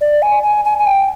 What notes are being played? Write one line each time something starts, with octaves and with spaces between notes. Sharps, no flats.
D5
G#5
G#5
G#5
G#5
G5